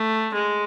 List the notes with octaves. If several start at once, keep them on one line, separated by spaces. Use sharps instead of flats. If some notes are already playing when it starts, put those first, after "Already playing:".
Already playing: A3
G#3